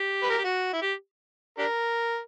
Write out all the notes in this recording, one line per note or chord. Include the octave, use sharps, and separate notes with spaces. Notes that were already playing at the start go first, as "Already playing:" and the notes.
Already playing: G4
B4
A#4
G4
F#4
E4
G4
D4 G4 A#4